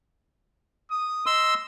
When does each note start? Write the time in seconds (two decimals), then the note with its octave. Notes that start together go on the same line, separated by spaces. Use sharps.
0.91 D#6
1.26 D#5 C6 E6